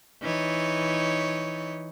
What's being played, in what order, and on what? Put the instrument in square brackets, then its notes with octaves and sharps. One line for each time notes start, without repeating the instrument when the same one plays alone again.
[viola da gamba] E3 D#4 C#5